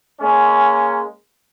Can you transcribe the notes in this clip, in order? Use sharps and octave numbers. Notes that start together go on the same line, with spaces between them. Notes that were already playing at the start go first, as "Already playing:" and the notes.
G#3 A#3 C#4